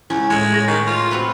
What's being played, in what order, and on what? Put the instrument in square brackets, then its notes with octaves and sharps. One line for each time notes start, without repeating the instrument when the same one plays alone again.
[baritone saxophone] C#2 [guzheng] C#4 [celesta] E4
[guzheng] A2 C#5 [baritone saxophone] G#3
[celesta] G#4 A#6
[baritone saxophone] D#3 [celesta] C#6
[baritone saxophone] F4
[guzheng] C4 F#4 B4